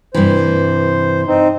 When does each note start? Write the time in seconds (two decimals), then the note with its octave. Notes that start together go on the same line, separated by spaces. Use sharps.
0.14 G2 C3 E3 C5
1.27 C4 D#4